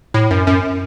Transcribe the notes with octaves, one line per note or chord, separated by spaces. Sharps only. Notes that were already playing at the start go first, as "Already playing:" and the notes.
A2
F#2
F#2